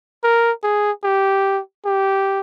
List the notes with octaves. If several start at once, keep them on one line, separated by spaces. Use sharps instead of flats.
A#4
G#4
G4
G4